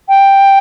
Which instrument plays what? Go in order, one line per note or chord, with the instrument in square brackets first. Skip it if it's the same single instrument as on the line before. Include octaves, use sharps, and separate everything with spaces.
[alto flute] G5